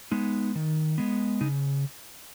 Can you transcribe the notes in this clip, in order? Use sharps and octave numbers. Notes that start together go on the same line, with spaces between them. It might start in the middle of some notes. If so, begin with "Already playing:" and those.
G#3 B3 D#4
D#3
G#3 B3
C#3 D#4